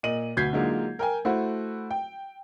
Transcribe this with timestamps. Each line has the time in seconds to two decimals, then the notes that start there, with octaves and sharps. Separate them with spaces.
0.03 A#2 D#5 D#7 F#7
0.37 D2 B2 G6 G#6 B6 C7
0.53 D3 F#3 G#3 A#3 D#4 F4
0.99 A#4 G5 G#5
1.25 A3 E4 F#4 C5
1.91 G5